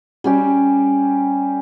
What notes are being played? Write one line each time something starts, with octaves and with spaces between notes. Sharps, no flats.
G3 C#4 G4